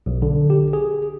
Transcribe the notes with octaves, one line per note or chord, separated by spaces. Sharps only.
B1
D3
G4
G#4